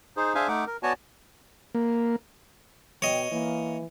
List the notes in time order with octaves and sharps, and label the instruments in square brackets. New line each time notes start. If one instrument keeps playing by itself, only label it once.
[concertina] D#4 G#4 C5
D4 G#4 C5 E5 F5 G#5
A3 D#4 F#5 D6
A#4
B3 F#4 C#5 D5 G#5 A5
[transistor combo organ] A#3
[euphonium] B2 [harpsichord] C#5 D#5 [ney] G5
[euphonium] E3 [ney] A#3